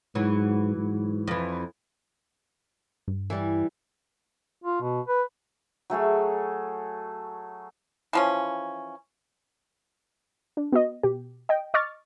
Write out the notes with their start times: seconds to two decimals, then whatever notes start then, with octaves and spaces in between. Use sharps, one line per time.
0.15 G#2 E3 F#3
0.77 G#2
1.28 F2 E3
3.08 G2
3.30 E3 G3
4.64 F4
4.81 B2
5.08 B4
5.90 F#3 A3 G#4 C#5
8.13 E3 F3 C#4
10.57 D4
10.72 B3 F#4 D#5
11.03 B2 G4
11.49 D#5 G5
11.74 D#5 C#6 D6 F6 A6